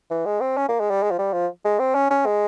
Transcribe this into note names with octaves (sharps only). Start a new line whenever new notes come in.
E3
G#3
C4
C#4
A#3
G#3
G3
G#3
F3
G3
F3
G#3
C4
C#4
C#4
G#3